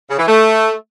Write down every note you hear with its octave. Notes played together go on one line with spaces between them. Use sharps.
C#3
E3
A3